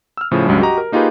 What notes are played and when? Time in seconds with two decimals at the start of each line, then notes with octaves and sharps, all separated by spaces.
0.17 E6 F6
0.31 A2 C#3 F3
0.46 C#2 G2 F#3 G#3 C#4
0.61 F#4 G4 D#5 A#5
0.78 A#4
0.92 A#3 D#4 F4 G4 G#4 B4